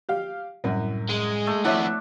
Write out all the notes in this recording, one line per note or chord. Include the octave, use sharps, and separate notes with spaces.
G4 F5 F6
C2 F#2 A2
G#3
A3
F2 B3 D4 E4 C#5 E5 E6